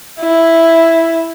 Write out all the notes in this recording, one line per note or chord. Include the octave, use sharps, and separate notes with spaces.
E4